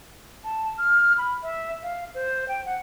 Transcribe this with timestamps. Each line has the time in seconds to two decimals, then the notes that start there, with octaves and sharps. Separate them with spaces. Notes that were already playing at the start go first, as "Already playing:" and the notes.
0.44 A5
0.78 F6
1.18 B5
1.42 E5
1.83 F5
2.14 C5
2.48 G5
2.66 F#5